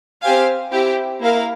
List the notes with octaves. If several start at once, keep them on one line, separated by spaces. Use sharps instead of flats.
C4 G4 C5 F5 G#5
C4 E4 G4
A#3 E4 A#4 F5